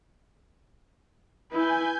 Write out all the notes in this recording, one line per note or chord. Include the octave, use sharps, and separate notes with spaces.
E4 B4 G#5 G6